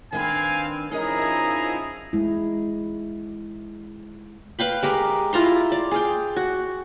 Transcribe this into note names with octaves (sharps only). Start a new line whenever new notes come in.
D#3 C4 D4 B4 F5 G#5
F3 C#4 D#4 E4 G#4 A#4 D#5 A#5
G#3 E4
B4 F5 G5 B5
G#3 G4 A#4
E4 F4 A#5 C6
D5
G#4 F5 G5
F#4